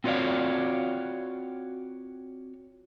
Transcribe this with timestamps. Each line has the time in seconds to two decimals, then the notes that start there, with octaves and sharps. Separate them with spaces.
0.04 C4 F4 F#4 C#5 D5 F5